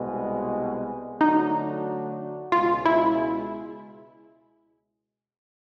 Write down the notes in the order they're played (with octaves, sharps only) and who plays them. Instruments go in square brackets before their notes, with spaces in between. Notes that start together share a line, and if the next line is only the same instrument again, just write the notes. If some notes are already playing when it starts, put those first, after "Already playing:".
Already playing: [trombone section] C2 B2 G#3
[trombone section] D3 F#3 A3 D4 F#4 [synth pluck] D#4
[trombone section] C#2 B2 G#3 [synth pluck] F4
[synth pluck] E4